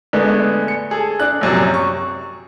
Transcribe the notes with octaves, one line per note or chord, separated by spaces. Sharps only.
D3 G#3 A3 B3
C#7
G#4 A4
D4 F#6
A#1 F#2 C3
C#6